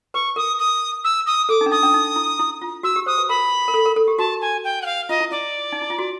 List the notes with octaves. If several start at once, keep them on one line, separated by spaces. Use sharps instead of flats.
B4 C#6
A#4 D#6
D#6
E6
D#6
A4 D6
D#4
D4
D#4 D#6
D4
D#4
E4
E4
F4
F#4 E6
G4
C5 D#6
B4
A#4 B5
A#4
A4
A#4
A4
G4
F#4 A5
G#5
G5
F#5
F5
F4 D#5
E4
E4 D5
D#4
E4
F4
F#4